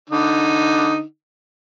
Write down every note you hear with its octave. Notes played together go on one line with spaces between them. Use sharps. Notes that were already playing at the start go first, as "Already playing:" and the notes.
D3 D#4